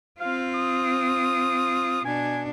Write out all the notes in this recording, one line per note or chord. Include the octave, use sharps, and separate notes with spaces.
C4 F4 F5
D#6
B2 D4 G#5